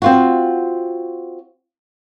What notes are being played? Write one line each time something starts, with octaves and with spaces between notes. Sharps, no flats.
C4 F4 F#4